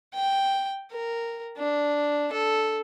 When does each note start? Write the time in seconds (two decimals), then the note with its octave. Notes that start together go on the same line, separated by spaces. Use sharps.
0.14 G5
0.91 A#4
1.58 D4
2.32 A4